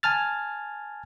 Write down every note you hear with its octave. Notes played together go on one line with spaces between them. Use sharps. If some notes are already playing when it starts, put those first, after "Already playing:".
G#5 A5 F6 A6